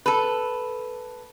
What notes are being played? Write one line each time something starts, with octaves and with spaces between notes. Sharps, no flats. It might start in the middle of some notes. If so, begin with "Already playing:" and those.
A4 B4